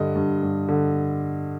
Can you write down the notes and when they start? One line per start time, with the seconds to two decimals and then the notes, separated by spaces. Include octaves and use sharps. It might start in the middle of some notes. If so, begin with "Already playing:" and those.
Already playing: G2 D3 D#5
0.15 G2
0.43 G2
0.68 D3